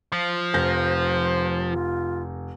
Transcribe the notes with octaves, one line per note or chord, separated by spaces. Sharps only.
F3
F1 C5 G6 A#6
F4